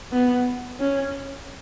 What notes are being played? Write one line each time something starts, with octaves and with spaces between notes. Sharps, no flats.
B3
C#4